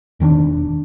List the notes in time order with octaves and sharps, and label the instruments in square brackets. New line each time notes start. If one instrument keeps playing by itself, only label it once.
[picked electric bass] E1 D#3 C#4 D4